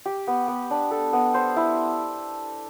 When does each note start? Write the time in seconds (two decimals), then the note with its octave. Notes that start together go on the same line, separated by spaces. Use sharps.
0.06 G4
0.27 B3
0.48 B3
0.71 D4
0.91 A4
1.13 B3
1.34 C5
1.56 E4